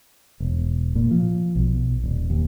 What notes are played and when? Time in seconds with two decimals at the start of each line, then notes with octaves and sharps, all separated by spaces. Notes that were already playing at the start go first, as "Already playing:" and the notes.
0.40 E1
0.96 A#2
1.11 F3
1.55 B1
2.03 D#1
2.30 D#2